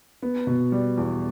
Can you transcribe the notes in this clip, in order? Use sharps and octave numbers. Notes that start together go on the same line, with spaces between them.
B3
B2
G3
E2